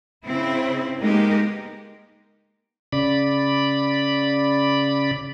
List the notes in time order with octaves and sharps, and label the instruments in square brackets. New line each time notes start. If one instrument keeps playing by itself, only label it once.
[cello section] C#3 C4 E4
G#3 A#3 B3 D#4 G4 A#4
[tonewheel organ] C#3 D5 B5